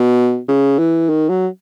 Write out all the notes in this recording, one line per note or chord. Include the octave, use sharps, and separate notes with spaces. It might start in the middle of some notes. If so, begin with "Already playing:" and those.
Already playing: B2
C#3
E3
D#3
F#3